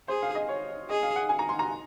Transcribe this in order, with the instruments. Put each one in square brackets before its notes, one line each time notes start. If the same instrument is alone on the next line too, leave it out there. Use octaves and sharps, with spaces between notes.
[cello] G#4 [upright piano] C5
[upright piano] F5
D#5
C#5
[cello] G#4 [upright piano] D#5
[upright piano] F5
F#5
G#5
A#5
C6
A#5